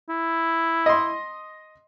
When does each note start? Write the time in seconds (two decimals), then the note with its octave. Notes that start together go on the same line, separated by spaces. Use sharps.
0.09 E4
0.86 D#5 C6